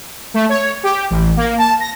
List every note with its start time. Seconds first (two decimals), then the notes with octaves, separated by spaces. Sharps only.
0.34 A3
0.49 C#5
0.83 G4
1.10 A1
1.37 A#3
1.58 A5
1.80 A#6